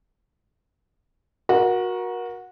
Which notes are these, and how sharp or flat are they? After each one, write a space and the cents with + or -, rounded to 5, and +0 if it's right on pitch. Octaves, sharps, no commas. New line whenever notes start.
F#4 -15 A#4 +25